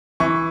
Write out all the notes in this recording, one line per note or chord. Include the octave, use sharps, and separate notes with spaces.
E3 C#6